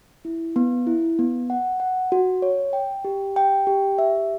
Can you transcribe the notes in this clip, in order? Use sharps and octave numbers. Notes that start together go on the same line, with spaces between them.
E4
B3
E4
B3
F#5
F#5
F#4
C#5
G5
G4
G5
G4
E5